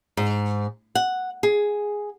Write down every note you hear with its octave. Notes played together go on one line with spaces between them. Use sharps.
G#2
F#5
G#4